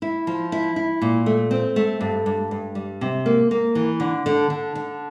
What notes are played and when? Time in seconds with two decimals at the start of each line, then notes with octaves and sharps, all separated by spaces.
0.02 E4
0.27 F3
0.52 E4
0.76 E4
1.02 A#2
1.26 A3
1.51 C4
1.76 A3
2.01 G2
2.26 G2
2.51 G2
2.75 G3
3.01 C3
3.26 A#3
3.51 A#3
3.75 E3
4.00 D3
4.26 D3
4.50 D3
4.75 D3